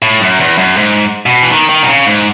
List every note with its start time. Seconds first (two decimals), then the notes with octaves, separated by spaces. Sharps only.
0.02 A2
0.21 F#2
0.40 E2
0.58 F#2
0.77 G#2
1.26 B2
1.43 E3
1.51 D#3
1.69 D#3
1.83 B2
1.88 C#3
2.06 G#2